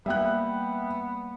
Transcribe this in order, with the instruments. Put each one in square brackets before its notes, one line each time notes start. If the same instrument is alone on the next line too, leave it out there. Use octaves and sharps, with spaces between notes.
[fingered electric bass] G3 A#3 [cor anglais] B3 [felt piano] E5 G5 F#6